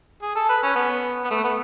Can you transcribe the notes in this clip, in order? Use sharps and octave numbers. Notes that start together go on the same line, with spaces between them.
G#4
A4
B4
C#4
B3
B3
A3
B3